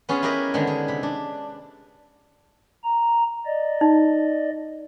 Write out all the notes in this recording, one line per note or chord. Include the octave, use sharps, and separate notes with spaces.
B3 C#4 F4 G#4
E4 G4 G#4 A#4 B4 D#5
D3 D#3 G#3 B3
G#4
C3 B5
D4
A#5
D5 D#5
D#4